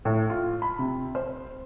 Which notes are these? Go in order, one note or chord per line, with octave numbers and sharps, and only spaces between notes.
A2
F4
B5
C3
C5